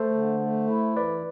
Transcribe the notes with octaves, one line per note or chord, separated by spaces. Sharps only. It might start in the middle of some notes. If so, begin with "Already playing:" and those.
Already playing: A3 A4 C5
D3
A3
E4
E3 B4 D5